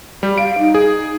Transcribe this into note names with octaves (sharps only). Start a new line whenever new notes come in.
G3 G4
F5 D7
D#4
G#4